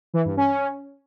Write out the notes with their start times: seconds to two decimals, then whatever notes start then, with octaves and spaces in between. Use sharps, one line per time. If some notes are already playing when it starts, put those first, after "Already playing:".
0.14 E3
0.25 G2
0.37 C#4